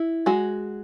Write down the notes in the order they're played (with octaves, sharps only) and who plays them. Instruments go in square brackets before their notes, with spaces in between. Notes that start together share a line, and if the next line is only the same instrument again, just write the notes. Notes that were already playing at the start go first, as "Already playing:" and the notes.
Already playing: [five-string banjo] E4
G#3 F#4